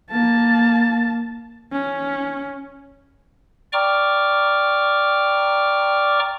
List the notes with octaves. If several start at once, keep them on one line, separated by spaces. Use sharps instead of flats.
A#3 A5
C#4
D5 G5 A#5 C#6 D6 F6